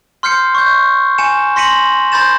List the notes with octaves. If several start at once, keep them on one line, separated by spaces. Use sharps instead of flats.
C6 F6 G6 C7 C#7
C#6 G6
G#5 C#7 E7
C6 A#6 B6 C#7 D#7 F#7
B5 C6 G6 A6 E7